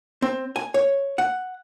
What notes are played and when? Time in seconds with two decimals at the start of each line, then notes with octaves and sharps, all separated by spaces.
0.22 C4
0.56 G#5
0.74 C#5
1.18 F#5